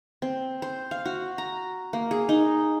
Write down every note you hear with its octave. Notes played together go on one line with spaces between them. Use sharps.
C4
C5
F5
F#4
A#5
A#3
G#4
D#4